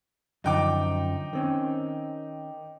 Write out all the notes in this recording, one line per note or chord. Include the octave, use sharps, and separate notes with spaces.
F#2 D3 F3 D#4 G5 D6
D#3 C4 C#4